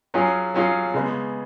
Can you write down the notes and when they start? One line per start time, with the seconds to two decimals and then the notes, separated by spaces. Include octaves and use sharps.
0.14 F#3 C#4 F4 G#4
0.54 F#3 C#4 F4 G#4
0.94 C#3 G#3 B3